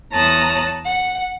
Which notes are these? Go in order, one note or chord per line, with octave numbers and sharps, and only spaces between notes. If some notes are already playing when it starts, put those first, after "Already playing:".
E2 C#5 A5 A#5 D#6 F#6
F#5